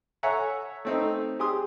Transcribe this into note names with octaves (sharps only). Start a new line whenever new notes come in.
A4 C#5 E5 F#5 G#5 A#5
A3 C4 D#4
G4 G#4 C6 D#6